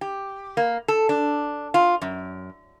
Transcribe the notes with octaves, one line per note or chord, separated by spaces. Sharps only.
G4
A#3
A4
D4
F4
F#2